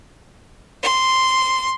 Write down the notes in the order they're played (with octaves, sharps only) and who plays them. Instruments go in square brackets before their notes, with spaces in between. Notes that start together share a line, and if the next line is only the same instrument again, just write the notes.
[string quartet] C6